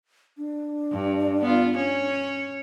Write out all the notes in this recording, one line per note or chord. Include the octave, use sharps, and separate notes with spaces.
D4
G2
B3 F4
C#4 C#5